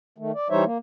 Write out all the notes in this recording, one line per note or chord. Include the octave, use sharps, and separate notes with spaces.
D#3 A3
D5
E3 G3 D#4 C5 C#5 E5
A#3